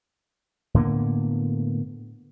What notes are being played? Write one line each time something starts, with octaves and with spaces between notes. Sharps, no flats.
A2 D3 A#3 B3